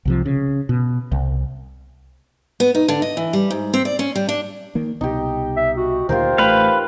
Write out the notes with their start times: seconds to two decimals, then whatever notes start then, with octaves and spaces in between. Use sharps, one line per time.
0.05 C2 C3 F3
0.26 C#3
0.69 B2
1.12 C2
2.60 B3
2.75 D#4
2.88 D3
3.02 D#5
3.17 E3
3.33 G3
3.51 G#2
3.74 C4
3.85 D5
3.99 C#4
4.15 G3
4.29 D4
4.75 D#3 A#3
5.01 C2 B2 D#4 G4
5.57 E5
5.77 F#4
6.09 D2 A#2 D#3 F4 G4 A#4 C5
6.38 A1 A3 B4 F5 G5 B5 C6